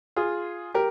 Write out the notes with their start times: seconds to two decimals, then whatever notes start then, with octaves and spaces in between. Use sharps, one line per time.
0.16 F4 G#4
0.74 G4 A#4